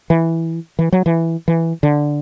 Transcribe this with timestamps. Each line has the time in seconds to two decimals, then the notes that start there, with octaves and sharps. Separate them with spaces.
0.10 E3
0.79 E3
0.92 F#3
1.06 E3
1.48 E3
1.83 D3